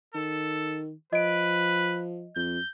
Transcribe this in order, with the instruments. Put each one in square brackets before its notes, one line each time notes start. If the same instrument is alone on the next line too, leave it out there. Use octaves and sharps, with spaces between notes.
[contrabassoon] D#3 [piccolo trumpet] A4
[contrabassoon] F3 [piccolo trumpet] B4 [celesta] D#5 D7
[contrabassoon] F2 [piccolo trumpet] G6